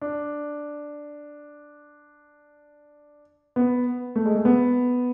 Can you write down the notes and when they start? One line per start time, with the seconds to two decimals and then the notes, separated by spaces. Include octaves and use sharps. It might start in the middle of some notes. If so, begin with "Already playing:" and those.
0.01 D4
3.56 B3
4.16 A3
4.26 G#3
4.35 A3
4.45 B3